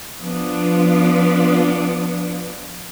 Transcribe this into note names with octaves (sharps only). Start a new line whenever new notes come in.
F3 B3 D4 F4